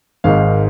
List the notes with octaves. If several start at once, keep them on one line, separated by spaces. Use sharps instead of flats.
G#1 G#2 D#3 F5